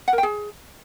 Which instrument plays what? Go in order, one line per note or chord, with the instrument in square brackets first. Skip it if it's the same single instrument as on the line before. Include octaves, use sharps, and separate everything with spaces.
[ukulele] F#5
A#4
G5
G#4